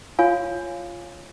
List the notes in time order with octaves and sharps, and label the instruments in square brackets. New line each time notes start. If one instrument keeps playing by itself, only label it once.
[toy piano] F4 C#5 F5 G#5